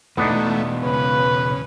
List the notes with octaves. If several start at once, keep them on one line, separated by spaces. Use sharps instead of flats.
E2 B2 E3 A3 B3 D4 D#4
C#3 B4